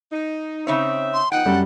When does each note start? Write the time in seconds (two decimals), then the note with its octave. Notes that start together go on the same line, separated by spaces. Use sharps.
0.12 D#4
0.67 C#3 C4 D#4 C#5 E5
1.14 C6
1.32 F3 B3 D#4 F#5 G5
1.45 F#2 G3 D4 F#4 A4